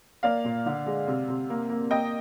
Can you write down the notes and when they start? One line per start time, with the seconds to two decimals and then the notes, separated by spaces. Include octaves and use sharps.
0.23 A#3 D5 F5
0.44 A#2
0.66 D3
0.86 G#3
1.07 C3
1.28 C3
1.50 A#3
1.69 A#3
1.90 A#3 D#5 G5